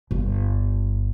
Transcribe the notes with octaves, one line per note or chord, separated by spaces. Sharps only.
G1